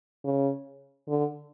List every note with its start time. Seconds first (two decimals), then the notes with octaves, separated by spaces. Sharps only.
0.24 C#3
1.09 D3